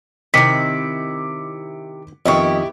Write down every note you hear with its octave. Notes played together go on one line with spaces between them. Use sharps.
C3 D#3 C4 E4 D#5 D6 B6 C#7
F2 D#3 B3 E4 G4 D#5 C#6